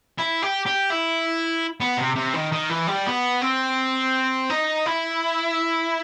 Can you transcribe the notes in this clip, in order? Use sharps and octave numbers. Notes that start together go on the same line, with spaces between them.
E4
G4
G4
E4
B3
C3
C3
D#3
D#3
E3
G3
B3
C4
D#4
E4